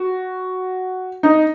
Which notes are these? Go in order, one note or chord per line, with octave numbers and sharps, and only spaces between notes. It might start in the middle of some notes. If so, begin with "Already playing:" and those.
Already playing: F#4
D#4